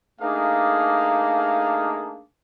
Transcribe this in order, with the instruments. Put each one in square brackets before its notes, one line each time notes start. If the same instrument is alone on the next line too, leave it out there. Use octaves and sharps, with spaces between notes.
[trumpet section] A3 A#3 D4 D#4 G#4 F5